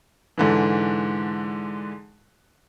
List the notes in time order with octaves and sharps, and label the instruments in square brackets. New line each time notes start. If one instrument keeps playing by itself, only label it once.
[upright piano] G#2 D3 E3